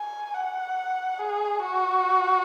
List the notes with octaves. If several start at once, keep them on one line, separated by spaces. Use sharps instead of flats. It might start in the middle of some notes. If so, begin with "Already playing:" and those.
Already playing: G#5
F#5
G#4
F#4